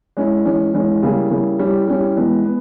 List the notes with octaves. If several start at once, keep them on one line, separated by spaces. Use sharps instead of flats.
G#3 C#4 E4
E3 G#3 C#4
E3 G#3 C#4
C#3 G3 A#3 E4 G#4
C#3 G3 A#3 E4 G#4
G3 C#4 E4 G4
G3 C#4 E4 G4
E3 G#3 B3
B3